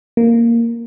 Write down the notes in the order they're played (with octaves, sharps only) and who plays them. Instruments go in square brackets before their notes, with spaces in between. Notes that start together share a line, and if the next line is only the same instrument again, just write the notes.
[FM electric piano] A#3